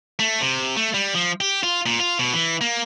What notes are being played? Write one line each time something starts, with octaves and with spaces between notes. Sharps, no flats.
A3
C3
A3
G3
F3
G4
F4
A#2
F4
B2
E3
A#3